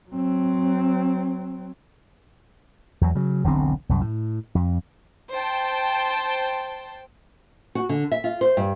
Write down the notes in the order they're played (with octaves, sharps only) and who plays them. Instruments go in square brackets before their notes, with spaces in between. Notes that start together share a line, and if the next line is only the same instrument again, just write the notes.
[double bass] F#3 C4
[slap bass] E2 F#3
C#3 F#3
E1 B1 D3 C4
C2 F#2
A2
F2
[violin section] C5 G5 A5
[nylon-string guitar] F#4
D3
E5
F4
C5
G2